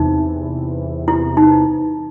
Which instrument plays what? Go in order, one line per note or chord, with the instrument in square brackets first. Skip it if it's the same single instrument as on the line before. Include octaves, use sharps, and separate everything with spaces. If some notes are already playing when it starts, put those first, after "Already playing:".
Already playing: [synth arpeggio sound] E2 C3 E3 [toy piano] D#4
[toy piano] E4
D#4